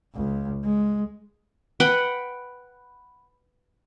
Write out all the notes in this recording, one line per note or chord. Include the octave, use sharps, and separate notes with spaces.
C#2
G#3
B4 F#5 G5 B5